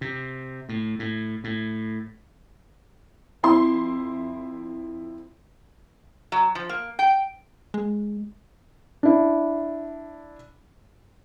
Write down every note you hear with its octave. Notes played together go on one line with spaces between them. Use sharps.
C3
A2
A2
A2
F2 E4 C6
F#3
F3
A#3
G5
G#3
D4 E4